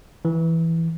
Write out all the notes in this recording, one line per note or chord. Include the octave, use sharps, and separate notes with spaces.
E3